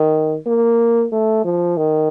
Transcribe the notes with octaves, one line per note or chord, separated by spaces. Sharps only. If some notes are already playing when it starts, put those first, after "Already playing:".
Already playing: D#3
A#3
A3
F3
D#3